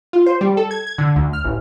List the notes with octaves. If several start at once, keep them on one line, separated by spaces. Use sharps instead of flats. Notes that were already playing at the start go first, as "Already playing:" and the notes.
F4
C5
G3
A4
G#6
G#6
D3
D2
F6
A1